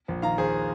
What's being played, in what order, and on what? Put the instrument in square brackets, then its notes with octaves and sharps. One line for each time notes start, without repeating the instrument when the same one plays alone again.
[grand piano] A#1
D#3 F5 A#5
D#2 G#4 C5